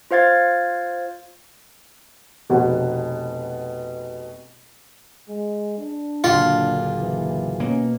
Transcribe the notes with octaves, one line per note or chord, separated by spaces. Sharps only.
F4 C5 F5 G#6 A6
F1 B2 F#5
G#3
D4
F#1 A#2 D3 F4
E3
B2 A#3 C#4